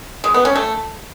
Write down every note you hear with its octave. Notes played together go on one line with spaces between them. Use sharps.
G#3
B3
C#4
A3